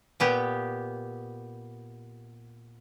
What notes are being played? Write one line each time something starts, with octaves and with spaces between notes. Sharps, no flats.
A#2 B3 G4